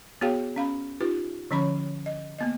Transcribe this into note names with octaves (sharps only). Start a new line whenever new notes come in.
B3 F#4 G#4 C#5 F5 G5
C#4 F5 B5
D#4 F4 G4 B4
D3 F3 C#4 C#5 B5 C#6
D#5
A#3 B3 D#5